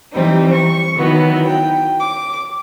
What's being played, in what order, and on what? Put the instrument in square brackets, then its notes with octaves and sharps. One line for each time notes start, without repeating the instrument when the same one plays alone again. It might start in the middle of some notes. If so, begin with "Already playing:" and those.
[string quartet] E3 G3 C4 D#4
C#6
D#3 E3 F#3 B3
G5
D6